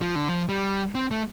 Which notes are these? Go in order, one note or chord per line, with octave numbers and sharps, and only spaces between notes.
F3
D3
F3
G3
C4
A3